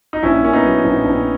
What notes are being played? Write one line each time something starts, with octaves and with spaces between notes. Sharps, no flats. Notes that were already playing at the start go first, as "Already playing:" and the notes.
D#4
A#1 C#4 E4
A#2 C#4
B3 D#4
F#3
A#1
A#1